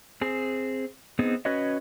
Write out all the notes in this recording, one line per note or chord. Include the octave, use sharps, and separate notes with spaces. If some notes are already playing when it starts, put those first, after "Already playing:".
C4 G#4
B3 C4 D#4 G#4
C#4 F#4 B4 C#5 D#5